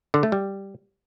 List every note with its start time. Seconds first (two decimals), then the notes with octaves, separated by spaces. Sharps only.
0.14 D3
0.23 A3
0.32 G3